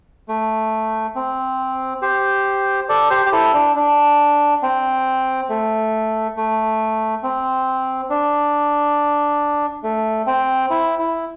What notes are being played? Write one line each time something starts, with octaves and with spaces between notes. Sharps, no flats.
A3
C4
G4 C5
A4 D5
G4 C5
G4
E4 A4
D4
D4
C4
A3
A3
C4
D4
A3
C4
E4
E4